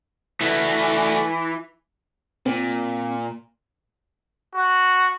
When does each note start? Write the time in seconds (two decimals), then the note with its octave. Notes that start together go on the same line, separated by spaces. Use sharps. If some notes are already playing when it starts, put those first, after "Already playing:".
0.41 E3 A3 F#4
2.46 A#2 C4
4.55 F#4